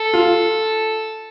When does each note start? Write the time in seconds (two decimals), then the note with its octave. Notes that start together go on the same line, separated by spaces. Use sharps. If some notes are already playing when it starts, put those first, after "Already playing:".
Already playing: A4
0.14 F4